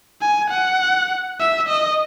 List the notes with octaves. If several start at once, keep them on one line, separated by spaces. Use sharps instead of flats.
G#5
F#5
E5
D#5